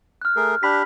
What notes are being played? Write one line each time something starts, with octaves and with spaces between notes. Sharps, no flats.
F6 F#6
A3 G#4 A#4
D4 G4 B5 B6